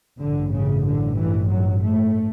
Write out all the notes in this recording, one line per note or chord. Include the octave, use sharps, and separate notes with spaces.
A1 G2 D3
C#3
D3
E3
F#3
A3